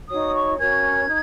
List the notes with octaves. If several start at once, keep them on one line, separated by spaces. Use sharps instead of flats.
D#4 F#4 C#5 D#6
C#6
C#4 F#4 A#4 C#5 G#6
D#4